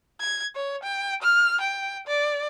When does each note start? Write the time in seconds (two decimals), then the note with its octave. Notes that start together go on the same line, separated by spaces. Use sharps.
0.21 G#6
0.55 C#5
0.83 G5
1.22 F6
1.61 G5
2.07 D5